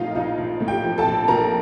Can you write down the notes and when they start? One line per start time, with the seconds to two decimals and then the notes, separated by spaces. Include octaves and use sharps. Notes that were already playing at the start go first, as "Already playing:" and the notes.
Already playing: A#1 A2 F3 D#4 F4 D#5 F5
0.15 A#1 D#4 D#5
0.38 A#1
0.60 A2
0.68 G4 G5
0.84 F3
0.98 A4 A5
1.06 A#1
1.28 A#1 A#4 A#5